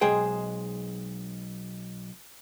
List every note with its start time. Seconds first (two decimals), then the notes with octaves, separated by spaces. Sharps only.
0.01 B1 G#3 G#4 C5 G5